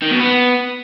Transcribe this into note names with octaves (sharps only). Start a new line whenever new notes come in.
D#3
B2
B3